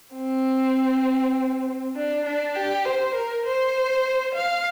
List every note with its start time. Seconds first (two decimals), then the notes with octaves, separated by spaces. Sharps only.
0.16 C4
1.96 D4
2.26 D4
2.55 G4
2.86 C5
3.15 A#4
3.46 C5
4.35 F5